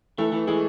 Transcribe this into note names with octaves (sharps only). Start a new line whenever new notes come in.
E3 A3 A4
E3
E3 G#3 G#4